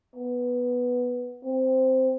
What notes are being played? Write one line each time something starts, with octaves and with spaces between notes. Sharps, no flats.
B3
C4